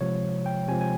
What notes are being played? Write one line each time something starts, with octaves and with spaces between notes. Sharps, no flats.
C3 F3 G#3 C#5
G5
C3 F3 G#3 G#5
G#5